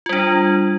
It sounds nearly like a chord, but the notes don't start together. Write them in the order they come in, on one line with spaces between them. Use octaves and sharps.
F4 G3 D4